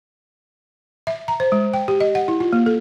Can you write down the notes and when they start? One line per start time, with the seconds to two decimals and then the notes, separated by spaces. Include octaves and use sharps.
1.07 E5
1.28 A#5
1.40 C5
1.52 G#3
1.74 G5
1.88 G4
2.00 D#5
2.15 F#5
2.28 E4
2.40 F4
2.53 A#3
2.66 A4